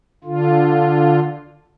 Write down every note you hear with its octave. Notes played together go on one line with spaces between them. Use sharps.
D3 F4